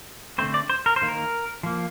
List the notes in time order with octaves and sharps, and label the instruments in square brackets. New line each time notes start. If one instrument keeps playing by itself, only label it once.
[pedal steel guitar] D3 A3 C4 C5
D5
C5
A#4
C5
D#3 A#3
A#4
F3 A#3